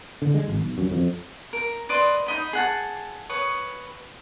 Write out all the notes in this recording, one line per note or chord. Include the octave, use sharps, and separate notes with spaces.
D3
G#3
G#1
B1
F#2
F2
A#4
B4 D5 D#5 C6
D#4 D#5 B5
G#4 F#5 A5
B4 C#5 D#6